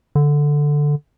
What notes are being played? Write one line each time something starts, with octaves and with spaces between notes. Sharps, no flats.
D3